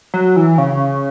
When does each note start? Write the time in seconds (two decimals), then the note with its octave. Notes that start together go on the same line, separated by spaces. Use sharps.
0.14 F#3
0.36 E3
0.58 C#3